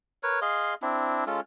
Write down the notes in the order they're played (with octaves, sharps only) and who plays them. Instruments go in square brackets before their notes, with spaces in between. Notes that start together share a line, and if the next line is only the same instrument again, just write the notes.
[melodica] A#4 B4 C#5
G#4 D#5 F5 C6
C4 D4 E4
G#3 C#4 F4 A4